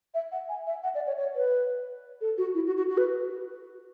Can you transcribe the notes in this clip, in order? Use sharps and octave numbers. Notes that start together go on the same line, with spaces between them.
E5
F#5
G#5
E5
F#5
D5
C#5
C#5
B4
A4
F#4
E4
F#4
F#4
F#4
B4